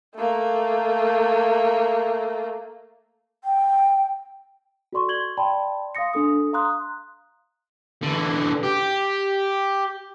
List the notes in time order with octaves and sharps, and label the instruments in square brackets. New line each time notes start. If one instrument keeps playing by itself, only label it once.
[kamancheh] A3 A#3
[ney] G5
[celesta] F#4 A4 D5 C6 C#6
G#6 F#7 G7
D5 G5 A5 B5 C6
F5 C6 D#6 A#6 C#7
D4 A4 D#6
F5 A#5 C6 D#6 F#6
[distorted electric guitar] D3 E3
G4